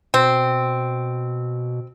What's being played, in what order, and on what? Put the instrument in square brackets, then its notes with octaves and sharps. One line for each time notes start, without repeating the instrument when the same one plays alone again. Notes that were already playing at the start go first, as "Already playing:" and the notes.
[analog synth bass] B2 [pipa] C4